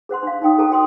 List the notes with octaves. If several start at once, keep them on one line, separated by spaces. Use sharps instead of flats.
G#4 C5 F#5 C6
D4 F5
D#4 D5 G5 D#6
G#4 A4 C5 A5 A#5
F#4 G5 C6 D#6